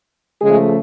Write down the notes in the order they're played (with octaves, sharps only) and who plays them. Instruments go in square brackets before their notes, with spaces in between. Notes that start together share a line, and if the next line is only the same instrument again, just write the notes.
[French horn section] C#3 F3 G#3 A3 G#4